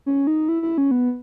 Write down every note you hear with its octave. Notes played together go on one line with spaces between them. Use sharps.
C#4
D#4
E4
E4
C#4
B3